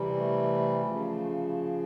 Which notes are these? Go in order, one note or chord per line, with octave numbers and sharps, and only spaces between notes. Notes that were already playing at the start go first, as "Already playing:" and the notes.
Already playing: C3 E3 G3
A3
C#3 F3